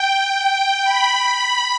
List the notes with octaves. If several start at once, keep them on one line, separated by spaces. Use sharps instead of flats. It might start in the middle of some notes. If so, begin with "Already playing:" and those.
Already playing: G5
G5
B5